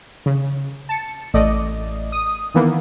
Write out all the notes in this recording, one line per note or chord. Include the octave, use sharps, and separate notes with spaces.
C#3
A5 C#7
A1 A3 D5 D#5
D#6
D#3 E3 A#3 B3